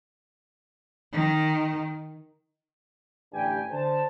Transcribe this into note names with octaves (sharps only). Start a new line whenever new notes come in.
D#3
A1 G2 D3 G4 G5 G#5
D3 C5 A5